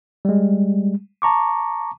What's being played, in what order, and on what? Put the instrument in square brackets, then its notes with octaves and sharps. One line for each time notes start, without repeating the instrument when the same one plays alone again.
[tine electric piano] G3 G#3
A5 A#5 C#6 D6